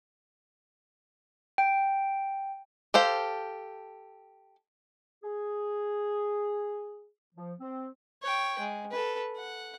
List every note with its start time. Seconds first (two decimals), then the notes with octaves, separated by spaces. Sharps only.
1.58 G5
2.94 G4 A4 C5 F5
5.24 G#4
7.35 F3
7.60 C4
8.23 C#5 G5
8.59 G#3
8.91 A4 B4
9.36 F#5